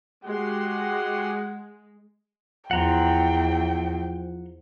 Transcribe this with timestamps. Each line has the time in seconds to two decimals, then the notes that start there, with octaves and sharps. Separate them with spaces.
0.24 G#3 F#4 G4 F#5 C6
2.71 E2 F3 F#5 G5 A#5 C6